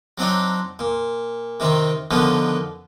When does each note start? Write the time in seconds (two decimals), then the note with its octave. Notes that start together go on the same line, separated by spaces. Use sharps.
0.18 F#3 C4 D4 D#4
0.79 A#2
1.60 C3 D#3 C4
2.11 B2 D3 D#3 F3 B3